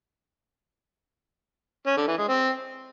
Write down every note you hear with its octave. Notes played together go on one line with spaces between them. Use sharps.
C#4
D3
E3
G#3
C4